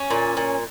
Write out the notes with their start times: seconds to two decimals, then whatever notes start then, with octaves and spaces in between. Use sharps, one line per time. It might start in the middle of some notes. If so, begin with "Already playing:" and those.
Already playing: C#4
0.10 A#2
0.37 A#2